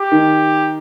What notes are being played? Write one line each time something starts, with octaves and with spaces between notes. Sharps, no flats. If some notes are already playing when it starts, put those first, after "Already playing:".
Already playing: G4
D#3